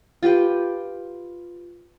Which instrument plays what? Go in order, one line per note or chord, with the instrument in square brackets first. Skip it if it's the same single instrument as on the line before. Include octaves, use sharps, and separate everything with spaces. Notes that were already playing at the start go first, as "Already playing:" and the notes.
[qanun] F4 G4 B4 G5